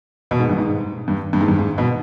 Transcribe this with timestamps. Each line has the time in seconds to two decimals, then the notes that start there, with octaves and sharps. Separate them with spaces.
0.31 B2
0.40 G#2
0.49 G2
0.58 G#2
1.08 G2
1.33 G2
1.41 G#2
1.48 G2
1.59 G#2
1.78 B2